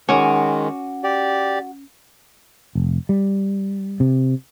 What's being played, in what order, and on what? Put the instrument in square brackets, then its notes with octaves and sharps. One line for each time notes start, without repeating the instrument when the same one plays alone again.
[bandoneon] D#3 G#3 [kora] C#4 [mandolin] F#4 D6
[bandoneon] G4 D5
[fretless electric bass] F1
G3
C3